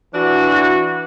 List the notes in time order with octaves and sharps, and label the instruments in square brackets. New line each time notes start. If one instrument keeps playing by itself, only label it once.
[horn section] E3 D4 F#4